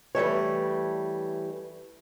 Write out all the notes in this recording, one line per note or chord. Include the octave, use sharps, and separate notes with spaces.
E3 G3 A3 C#5